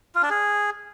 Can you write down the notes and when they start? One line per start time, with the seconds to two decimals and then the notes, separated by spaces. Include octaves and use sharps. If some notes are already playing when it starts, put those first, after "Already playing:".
0.15 F4
0.23 D4
0.30 G#4